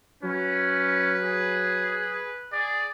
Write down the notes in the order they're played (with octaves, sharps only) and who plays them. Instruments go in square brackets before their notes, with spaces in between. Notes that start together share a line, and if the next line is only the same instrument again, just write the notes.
[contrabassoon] F#3 [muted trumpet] C#4 [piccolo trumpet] B4
[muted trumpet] G#4
[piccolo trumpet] G#4 [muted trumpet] D5